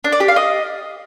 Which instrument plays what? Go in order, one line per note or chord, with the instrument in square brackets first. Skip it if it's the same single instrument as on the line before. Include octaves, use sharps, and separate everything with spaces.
[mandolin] D4
D5
G4
F5
D#5